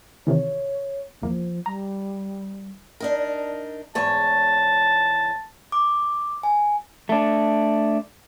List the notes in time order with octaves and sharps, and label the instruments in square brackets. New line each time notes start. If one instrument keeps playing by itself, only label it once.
[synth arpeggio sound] C3 D#3 E3 [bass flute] C#5
[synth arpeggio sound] G1 E2 A#3 [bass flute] F3
[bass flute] G3 [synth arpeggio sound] A#5
[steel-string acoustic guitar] D4 D#4 A#4
[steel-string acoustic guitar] E2 G#2 C#5 [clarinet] A5
[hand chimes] D6
G#5
[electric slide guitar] A3 D4